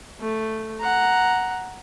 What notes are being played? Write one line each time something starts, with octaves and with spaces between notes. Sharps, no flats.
A3
F#5 A#5